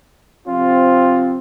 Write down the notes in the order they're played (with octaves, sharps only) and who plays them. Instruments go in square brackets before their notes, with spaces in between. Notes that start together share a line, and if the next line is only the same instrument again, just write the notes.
[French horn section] C3 F3 C4 [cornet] F4